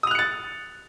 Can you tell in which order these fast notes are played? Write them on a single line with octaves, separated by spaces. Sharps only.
D#6 F7 F#6 C#7 A6